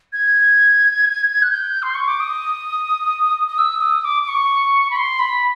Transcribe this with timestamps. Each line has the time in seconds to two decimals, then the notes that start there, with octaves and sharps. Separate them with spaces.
0.13 G#6
1.42 F#6
1.51 G6
1.83 C6
1.95 C#6
2.08 D6
2.20 D#6
3.48 D#6
3.58 E6
3.81 D#6
4.05 D6
4.23 D6
4.28 C#6
4.91 B5
4.96 C6
5.19 B5